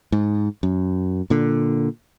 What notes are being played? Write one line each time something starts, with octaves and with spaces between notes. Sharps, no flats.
G#2
F#2
A#2 D3